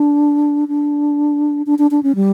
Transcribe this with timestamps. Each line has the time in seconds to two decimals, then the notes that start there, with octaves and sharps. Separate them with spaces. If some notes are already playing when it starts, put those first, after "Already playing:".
Already playing: D4
0.68 D4
1.66 D4
1.79 D4
1.91 D4
2.03 C#4
2.15 G3